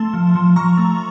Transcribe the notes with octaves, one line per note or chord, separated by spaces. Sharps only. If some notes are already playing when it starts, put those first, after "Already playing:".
Already playing: A3 A5 C6
F3
F3
F3 A#5 C#6
A3